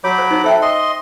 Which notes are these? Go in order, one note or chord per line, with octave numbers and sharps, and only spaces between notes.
F#3 C#5 B5 D6
C5
D#4 C5
A4 C5 E5 G5
D#5 C6